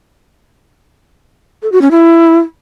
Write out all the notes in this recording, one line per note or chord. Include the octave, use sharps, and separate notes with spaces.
A4
F#4
C#4
E4